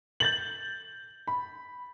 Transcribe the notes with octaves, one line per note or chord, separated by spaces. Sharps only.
G6 A6 F#7
B5